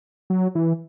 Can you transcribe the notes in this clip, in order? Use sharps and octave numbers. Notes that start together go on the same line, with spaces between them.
F#3
E3